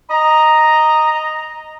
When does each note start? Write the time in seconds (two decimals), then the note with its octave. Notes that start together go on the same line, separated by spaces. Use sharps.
0.10 D#5 A#5